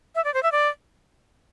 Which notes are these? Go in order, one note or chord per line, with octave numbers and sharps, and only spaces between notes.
E5
D5
C5
E5
D5